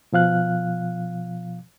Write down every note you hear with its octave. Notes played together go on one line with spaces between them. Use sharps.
B2 F3 F5 F#6